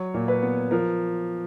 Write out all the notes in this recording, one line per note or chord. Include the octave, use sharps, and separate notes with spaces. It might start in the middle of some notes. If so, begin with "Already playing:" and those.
Already playing: F#3 C#5
A#2
B4
B3
F3 A#4